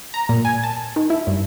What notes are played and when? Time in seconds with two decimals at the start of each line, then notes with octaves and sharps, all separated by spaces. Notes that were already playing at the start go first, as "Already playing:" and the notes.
0.14 A#5
0.29 A#2
0.45 G#5
0.63 A5
0.96 D#3
1.10 E4
1.27 G2